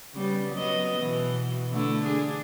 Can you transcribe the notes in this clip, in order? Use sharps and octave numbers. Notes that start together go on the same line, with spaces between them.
C#3 G3 B3
F#3 B3 D#5
B2 E3
D3 A3 E4
D4 G#4